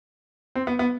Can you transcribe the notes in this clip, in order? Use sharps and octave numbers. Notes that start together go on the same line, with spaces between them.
C4
B3
B3